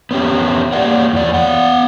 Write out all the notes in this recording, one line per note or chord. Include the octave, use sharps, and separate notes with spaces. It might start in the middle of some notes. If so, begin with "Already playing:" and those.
B3 C#4 G4
A#3 C#5 D5 F#5
E2 D5
B3 F5 F#5